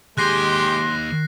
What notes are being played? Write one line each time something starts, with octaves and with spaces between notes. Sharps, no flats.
D#2 G#3 G4 G#5 C6 F#6 A#6 C7